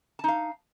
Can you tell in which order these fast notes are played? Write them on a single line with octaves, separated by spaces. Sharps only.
A5 D#4 F5